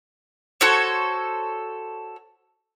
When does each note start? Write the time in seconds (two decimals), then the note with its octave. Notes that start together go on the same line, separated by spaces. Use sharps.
0.61 F#4 A4 C5 C#5